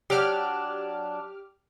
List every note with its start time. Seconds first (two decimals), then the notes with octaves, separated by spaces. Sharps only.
0.10 F#3 D4 G4 D6 F6